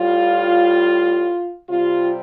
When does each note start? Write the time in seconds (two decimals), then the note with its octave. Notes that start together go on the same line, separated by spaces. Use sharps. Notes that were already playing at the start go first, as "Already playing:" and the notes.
Already playing: A2 G3 F4
1.68 C3 G3 F4